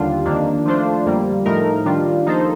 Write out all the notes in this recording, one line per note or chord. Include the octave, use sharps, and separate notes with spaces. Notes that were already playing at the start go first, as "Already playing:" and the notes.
Already playing: D#2 D3 G3 D4 F4
F2 D#3 A#3 D4
F3 A3 D4 F4 C5
F2 D3 G3 A#3
A2 F3 A3 D#4 A#4
D#3 G3 D4 F4
F3 A#3 D#4 A4 C5